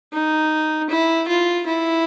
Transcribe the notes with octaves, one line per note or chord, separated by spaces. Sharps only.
D#4
E4
F4
E4